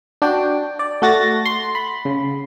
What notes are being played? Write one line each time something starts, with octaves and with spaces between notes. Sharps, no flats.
D4 F#4 G5
D5
A3 F#4 A6 A#6
C6
B5
C#3